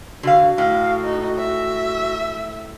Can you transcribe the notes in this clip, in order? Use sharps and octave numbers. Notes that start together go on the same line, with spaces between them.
D3 F#4 F5
A2 F5
D#4
E5